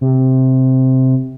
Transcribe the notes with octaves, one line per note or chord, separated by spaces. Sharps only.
C3